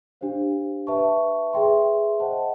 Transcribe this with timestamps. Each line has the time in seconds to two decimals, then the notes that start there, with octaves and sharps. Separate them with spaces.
0.21 D4 G4 C5 F5
0.87 B4 E5 A5 C#6
1.53 G#4 B4 E5 G5 C6
2.20 C5 D#5 F#5 A5